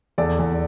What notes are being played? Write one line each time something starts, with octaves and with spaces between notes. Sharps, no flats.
E2 A4 D5
E2